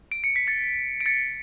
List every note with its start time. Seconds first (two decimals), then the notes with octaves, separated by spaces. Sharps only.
0.12 D7
0.24 C#7
0.36 B6
0.47 A6 C#7
1.01 D7
1.06 A6 C#7